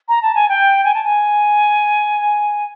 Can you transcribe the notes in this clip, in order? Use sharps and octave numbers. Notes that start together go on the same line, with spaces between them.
A#5
A5
G#5
G5
G#5
A5
G#5